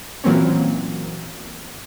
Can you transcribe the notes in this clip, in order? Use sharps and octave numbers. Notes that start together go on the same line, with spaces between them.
A#2 E3 F#3 A#3 C4 C#4